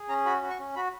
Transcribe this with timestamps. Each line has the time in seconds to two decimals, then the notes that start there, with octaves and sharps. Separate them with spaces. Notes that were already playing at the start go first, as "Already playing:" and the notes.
Already playing: G#4
0.08 C#4 A#5
0.25 F#4 B5
0.42 F#4
0.50 C#6
0.59 C#4
0.76 F#4 B5